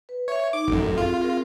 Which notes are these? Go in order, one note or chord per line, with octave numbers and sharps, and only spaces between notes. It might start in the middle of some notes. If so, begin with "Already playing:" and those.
B4
C#5 E5
D#4 D6
A1 F#2 F#4 A4
C4 F4 G#4
C4 G#4 A#4